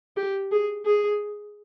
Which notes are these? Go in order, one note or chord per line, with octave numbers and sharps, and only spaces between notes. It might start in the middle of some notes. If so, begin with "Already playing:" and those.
G4
G#4
G#4